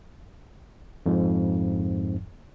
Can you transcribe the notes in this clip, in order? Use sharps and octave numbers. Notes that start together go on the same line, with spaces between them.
F2 G#2 F3